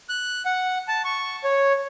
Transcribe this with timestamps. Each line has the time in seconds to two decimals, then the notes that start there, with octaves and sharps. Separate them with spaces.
0.09 F#6
0.45 F#5
0.88 A5
1.05 C#6
1.44 C#5